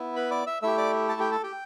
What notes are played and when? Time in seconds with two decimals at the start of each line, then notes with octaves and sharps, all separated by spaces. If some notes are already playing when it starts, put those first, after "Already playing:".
Already playing: B3 E4
0.16 B4 B5
0.31 D5 D6
0.47 E5 E6
0.62 A3 E4 G4 E5 E6
0.77 D5 D6
1.08 A4 A5
1.20 G4 G5
1.32 A4 A5
1.43 G4 G5